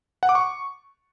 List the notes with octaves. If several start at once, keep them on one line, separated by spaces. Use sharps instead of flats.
F#5
D6
C#6